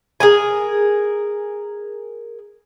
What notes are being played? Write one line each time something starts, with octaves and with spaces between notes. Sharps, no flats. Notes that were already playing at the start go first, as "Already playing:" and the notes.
G#4 A#4 G#5